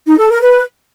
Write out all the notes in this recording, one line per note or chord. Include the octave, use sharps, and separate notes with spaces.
D#4
A4
A#4
B4